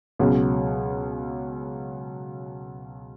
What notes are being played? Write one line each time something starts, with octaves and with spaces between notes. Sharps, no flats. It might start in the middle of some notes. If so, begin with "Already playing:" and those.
C#2 B2 F#3 C#4